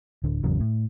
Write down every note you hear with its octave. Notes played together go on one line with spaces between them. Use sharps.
D1 D3
G#1 E2 C#3 F#3
A2